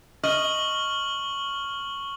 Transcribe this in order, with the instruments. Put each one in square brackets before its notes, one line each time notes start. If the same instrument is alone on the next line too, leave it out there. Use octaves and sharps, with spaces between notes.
[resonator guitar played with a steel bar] D#5 [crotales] C#6 F6 F#7